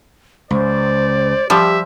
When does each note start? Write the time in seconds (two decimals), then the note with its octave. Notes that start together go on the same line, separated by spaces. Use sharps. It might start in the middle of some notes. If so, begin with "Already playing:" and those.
0.51 C#2 C5 D5
1.50 F3 G3 G4 E5